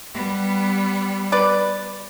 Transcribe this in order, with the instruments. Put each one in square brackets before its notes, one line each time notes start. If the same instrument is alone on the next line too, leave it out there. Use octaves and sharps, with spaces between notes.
[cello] G3 B3
[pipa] B4 D5